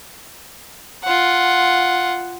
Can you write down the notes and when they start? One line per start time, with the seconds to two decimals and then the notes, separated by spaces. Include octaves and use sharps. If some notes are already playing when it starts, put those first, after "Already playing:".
1.04 F4 F#5